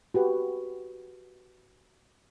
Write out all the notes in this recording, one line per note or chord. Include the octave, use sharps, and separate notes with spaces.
F#4 G4 B4